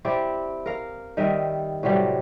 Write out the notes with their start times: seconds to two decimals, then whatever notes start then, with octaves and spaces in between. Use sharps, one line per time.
0.05 C4 E4 G4 D5
0.66 A#4 F5
1.17 D#3 G3 D#5 E5
1.83 A2 C3 F#3 G3